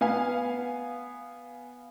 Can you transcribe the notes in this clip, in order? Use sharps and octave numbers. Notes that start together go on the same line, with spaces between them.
B3 F5 G#5